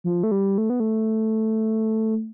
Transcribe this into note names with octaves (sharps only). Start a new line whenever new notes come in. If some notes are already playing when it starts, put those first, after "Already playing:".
F3
A3
G3
A3
B3
A3